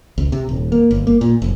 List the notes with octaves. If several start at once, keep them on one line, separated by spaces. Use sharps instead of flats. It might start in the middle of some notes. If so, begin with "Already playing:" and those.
C#2
C3
D#1
A#3
G1
A#3
A#2
F1